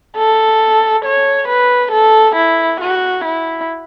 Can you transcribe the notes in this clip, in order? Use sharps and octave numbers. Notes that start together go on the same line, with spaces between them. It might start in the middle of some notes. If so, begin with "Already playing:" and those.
A4
C#5
B4
A4
E4
F#4
E4